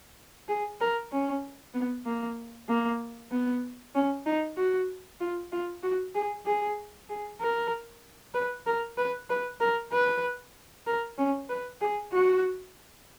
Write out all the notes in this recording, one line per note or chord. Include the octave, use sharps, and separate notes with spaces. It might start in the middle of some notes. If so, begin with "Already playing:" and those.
G#4
A#4
C#4
B3
A#3
A#3
B3
C#4
D#4
F#4
F4
F4
F#4
G#4
G#4
G#4
A#4
B4
A#4
B4
B4
A#4
B4
A#4
C#4
B4
G#4
F#4